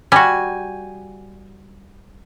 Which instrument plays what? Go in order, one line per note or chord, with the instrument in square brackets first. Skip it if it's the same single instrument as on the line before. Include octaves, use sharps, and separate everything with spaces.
[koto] G3 F#4 [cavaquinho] G#5